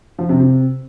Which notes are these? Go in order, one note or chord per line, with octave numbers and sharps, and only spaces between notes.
F3
C3
C3